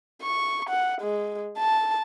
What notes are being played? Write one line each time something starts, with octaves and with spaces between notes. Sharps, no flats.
C#6
F#5
G#3
A5